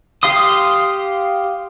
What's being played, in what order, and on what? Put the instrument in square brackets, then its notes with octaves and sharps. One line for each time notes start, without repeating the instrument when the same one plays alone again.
[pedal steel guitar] G4 F5 C6 D#6